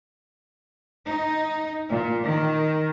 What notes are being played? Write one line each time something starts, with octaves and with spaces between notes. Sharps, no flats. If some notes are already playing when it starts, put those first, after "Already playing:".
D#4
A#2
D#3